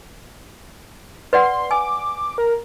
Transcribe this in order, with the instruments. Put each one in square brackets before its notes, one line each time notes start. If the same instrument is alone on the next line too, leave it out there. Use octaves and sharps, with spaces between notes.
[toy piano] B4 D5 F#5 [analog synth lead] C6
[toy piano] G#5 [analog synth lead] D6
[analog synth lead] A#4